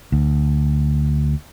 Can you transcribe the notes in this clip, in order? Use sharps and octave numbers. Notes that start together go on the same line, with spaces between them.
D2